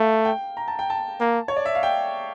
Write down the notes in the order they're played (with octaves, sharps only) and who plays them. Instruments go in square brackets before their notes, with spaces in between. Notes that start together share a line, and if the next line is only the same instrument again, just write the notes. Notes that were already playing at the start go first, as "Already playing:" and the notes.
Already playing: [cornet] A3 [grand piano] F5
[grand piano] G5
A#5
A5
G5
A5
[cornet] A#3
[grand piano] C#5
D5
E5
F5
G5